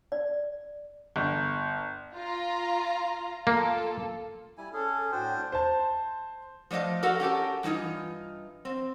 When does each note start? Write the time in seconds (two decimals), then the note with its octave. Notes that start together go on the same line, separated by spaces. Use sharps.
0.12 D5
1.16 G1
2.15 F4 A#5
3.47 A#3 F4 A4
4.58 G3 E4 G#5
4.73 C#4 G#4 A4
5.12 A2 D4 F#4 C5 G5
5.52 C5 A5
6.71 F3 A3 D5 D#5 F5
7.03 F#4 A4 A#4 F5 F#5
7.20 C#4 G4 A4 A#4
7.63 G2 E3 A#3 D#4 F4
8.65 C4